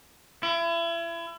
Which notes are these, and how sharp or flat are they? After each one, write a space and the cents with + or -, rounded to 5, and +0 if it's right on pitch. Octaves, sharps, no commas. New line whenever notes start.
E4 +35